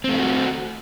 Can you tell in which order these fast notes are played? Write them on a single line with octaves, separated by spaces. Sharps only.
C4 A3 F4 F#4